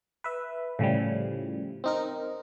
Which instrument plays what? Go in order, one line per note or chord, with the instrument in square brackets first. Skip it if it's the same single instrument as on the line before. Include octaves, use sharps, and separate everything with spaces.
[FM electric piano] B4 E5
A2 C#3 F3 G3
C4 D#4 A#4